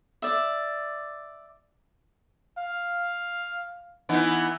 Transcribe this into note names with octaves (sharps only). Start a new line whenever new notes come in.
D5 E5
F5
E3 B3 D#4